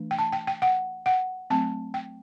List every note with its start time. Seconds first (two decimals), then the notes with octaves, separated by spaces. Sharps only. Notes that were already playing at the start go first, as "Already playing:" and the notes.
Already playing: E3 A3 D4
0.11 G5
0.18 A5
0.32 G5
0.47 G5
0.62 F#5
1.06 F#5
1.50 F#3 A3 C4 A5
1.94 G5